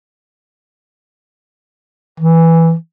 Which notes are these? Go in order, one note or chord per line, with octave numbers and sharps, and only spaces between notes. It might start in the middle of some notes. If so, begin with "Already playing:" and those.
E3